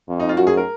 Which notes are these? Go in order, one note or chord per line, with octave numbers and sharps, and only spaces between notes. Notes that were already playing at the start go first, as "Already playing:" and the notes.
F2
D#4
F4
F#2 F#4
G#4
A#4